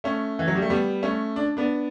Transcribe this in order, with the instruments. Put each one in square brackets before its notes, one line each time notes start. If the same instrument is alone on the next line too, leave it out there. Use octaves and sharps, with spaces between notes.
[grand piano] A3 C#4
E3
F#3
G3
A3
G3 B3
A3 C#4
D4
B3 D4